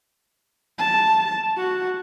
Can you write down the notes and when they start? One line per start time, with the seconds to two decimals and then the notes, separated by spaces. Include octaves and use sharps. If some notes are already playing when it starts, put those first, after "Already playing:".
0.79 A5
1.58 F#4